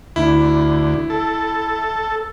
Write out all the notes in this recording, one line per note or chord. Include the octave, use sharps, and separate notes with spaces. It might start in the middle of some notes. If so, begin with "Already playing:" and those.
D2 E4
A4